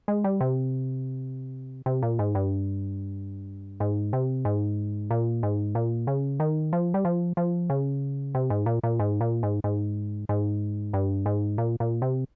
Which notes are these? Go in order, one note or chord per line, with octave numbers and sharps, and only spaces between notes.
G#3
G3
C3
C3
A#2
G#2
G2
G#2
C3
G#2
A#2
G#2
A#2
C#3
D#3
F3
G3
F3
F3
C#3
C3
G#2
A#2
A#2
G#2
A#2
G#2
G#2
G#2
G2
G#2
A#2
A#2
C3